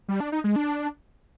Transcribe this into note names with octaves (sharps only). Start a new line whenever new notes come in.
G3
D4
D#4
G#3
D4